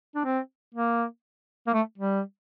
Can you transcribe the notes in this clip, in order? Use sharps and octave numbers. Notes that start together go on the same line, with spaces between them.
D4
C4
A#3
A#3
A3
G3